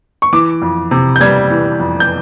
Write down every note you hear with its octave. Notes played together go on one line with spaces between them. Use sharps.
C#6
E3 D6
F2
C3
G6
G3 G#6
E3
F2
G6